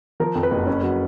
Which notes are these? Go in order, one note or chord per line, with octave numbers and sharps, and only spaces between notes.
F3 A#4
F2
B4
F#1
C#4
F#3